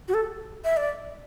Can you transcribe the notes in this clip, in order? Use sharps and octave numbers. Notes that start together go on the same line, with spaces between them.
F#4
A4
E5
D5